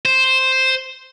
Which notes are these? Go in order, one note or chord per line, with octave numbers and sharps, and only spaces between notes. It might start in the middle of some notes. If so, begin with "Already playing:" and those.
C5